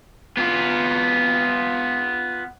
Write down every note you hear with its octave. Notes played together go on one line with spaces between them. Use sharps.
B3 F4